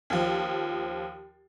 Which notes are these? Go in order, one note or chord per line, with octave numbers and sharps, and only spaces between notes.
D#2 F3